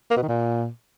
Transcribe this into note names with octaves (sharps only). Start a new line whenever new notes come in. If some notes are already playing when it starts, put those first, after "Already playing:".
A#3
B2
D#3
A#2